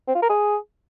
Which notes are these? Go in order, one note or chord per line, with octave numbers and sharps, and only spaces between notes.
C4
F4
A#4
G#4